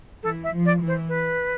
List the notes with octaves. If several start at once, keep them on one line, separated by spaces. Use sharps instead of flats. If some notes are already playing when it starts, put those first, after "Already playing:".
E3 A4
E5
F3
D5
E3
C5
B4